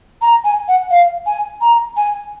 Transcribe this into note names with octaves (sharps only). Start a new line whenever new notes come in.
A#5
G#5
F#5
F5
G#5
A#5
G#5